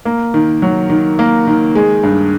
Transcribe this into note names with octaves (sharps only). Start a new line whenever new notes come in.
A#3
D#3
F#3
D#3
A#3
D#3
G#3
G2